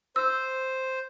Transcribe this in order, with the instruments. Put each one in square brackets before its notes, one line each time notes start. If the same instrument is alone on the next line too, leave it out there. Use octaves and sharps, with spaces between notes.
[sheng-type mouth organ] C5 [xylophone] E6